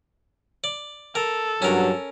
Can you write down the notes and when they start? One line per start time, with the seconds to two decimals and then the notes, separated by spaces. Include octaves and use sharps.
0.64 D5
1.15 A4 A#4
1.62 G2 F#3 C#4 A#4